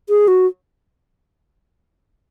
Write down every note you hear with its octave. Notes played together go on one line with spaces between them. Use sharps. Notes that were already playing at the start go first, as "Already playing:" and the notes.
G#4
F#4